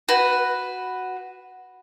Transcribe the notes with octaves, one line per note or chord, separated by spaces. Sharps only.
F#4 B4